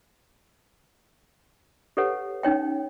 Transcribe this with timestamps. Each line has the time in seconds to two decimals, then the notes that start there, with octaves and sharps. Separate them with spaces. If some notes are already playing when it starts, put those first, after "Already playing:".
1.97 G4 A4 B4 C#5 F#5
2.43 C#4 D#4 C#5 G5